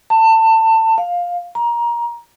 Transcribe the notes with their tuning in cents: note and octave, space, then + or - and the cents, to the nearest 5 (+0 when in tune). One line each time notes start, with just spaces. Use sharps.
A5 +25
F5 +10
A#5 +20